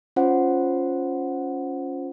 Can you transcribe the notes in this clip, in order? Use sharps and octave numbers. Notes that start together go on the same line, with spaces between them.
C#4 F4 C5 F#5